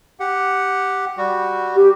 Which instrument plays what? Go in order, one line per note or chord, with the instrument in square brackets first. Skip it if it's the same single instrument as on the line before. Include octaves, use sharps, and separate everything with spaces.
[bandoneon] G4 F#5
G3 F#4
[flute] G4